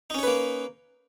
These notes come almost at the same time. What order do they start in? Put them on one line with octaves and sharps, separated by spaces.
D#4 C#4 C#5 B4 A#3